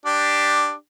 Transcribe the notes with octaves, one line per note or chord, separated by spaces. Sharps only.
D4 G4